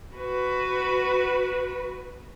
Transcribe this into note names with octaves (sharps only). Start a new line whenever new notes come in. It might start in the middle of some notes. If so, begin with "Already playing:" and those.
F#4 B4